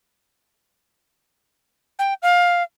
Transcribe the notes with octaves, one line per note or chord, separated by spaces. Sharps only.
G5
F5